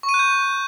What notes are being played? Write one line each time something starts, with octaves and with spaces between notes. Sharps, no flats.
C#6
D#7
F#6
G6